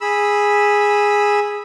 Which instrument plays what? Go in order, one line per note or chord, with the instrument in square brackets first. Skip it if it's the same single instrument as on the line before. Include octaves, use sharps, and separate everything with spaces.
[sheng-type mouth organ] G#4 B5 E6